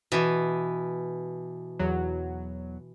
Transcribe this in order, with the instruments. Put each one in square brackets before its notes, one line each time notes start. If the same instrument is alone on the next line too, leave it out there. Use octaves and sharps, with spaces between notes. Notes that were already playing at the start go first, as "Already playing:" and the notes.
[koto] B2 E3
[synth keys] E2 F#3